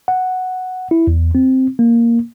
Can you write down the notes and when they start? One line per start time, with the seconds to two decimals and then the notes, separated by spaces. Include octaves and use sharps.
0.08 F#5
0.91 E4
1.07 E2
1.35 C4
1.79 A#3